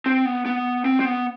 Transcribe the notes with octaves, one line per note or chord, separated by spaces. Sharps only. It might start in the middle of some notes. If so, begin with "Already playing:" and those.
C4
B3
B3
C4
C4
B3